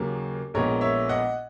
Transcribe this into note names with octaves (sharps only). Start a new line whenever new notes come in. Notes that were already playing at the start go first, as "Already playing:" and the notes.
Already playing: D#2 C#3 F#3 A#3
A#1 A#2 G#3 B3 A#4 C#5
C#5 E5
D#5 F#5